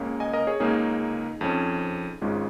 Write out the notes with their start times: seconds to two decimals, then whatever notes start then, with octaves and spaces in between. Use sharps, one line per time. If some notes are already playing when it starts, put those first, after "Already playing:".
Already playing: C#2 C#3 A#3 C#4
0.20 D#5 G#5
0.33 A#4 D#5
0.47 G#4 C#5
0.60 C#2 C#3 A#3 C#4 D#4 G#4
1.41 F2 F3 C#4
2.22 G#1 G#2 G#3 C#4 F4